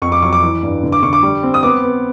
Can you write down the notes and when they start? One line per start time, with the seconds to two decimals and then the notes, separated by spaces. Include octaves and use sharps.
0.02 F2 C#6
0.12 D6
0.22 F#3 C#6
0.33 D6
0.42 E3
0.63 G2
0.83 D3
0.92 D6
1.03 D3 C#6
1.13 D6
1.23 G3
1.43 C4
1.54 D#6
1.63 B3 D6
1.83 B3